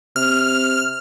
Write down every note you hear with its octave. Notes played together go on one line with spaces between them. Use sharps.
C3 F6